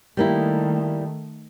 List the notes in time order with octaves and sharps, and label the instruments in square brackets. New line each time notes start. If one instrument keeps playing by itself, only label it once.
[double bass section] D#3 A3 [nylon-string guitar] G3 A#3 E4